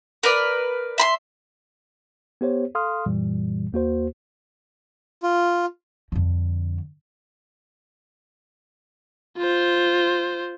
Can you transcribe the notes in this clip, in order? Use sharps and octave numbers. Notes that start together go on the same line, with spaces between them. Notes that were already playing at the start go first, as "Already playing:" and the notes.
A#4 B4 D5
E5 B5 C6
B3 G4 C5 C#5
A4 F5 C6 D#6 F6
F#2 A#2 E3 G3
D#2 A#3 F#4 C5
F4
F2 D3
F4 C5